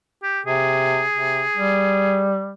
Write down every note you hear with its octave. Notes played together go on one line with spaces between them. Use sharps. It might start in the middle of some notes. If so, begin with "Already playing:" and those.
G4
C3 G#4
C3
G3